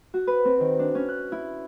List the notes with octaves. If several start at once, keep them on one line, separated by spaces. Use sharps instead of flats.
F#4
B4
C4
D#3
D4
C#4
F#6
E4